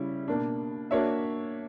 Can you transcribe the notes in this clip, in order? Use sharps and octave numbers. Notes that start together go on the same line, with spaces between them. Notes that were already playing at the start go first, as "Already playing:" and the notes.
Already playing: C#3 G3 C#4 E4
B2 A#3 D4
A#3 D4 F#4 C#5 E5